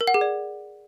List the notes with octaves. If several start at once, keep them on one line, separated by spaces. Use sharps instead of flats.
A#4
F#5
G#4
D5